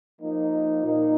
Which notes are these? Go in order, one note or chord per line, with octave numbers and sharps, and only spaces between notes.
F3 A#3 D#4
A#2 A#3 D#4